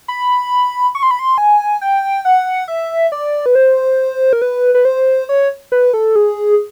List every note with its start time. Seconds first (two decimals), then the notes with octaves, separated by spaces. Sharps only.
0.08 B5
0.95 C#6
1.03 C6
1.11 B5
1.19 C6
1.38 G#5
1.81 G5
2.25 F#5
2.68 E5
3.12 D5
3.46 B4
3.55 C5
4.33 A#4
4.42 B4
4.75 B4
4.85 C5
5.29 C#5
5.72 B4
5.93 A4
6.16 G#4